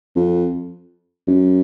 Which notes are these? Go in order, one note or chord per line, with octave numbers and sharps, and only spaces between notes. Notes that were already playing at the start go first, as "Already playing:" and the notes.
F2
F#2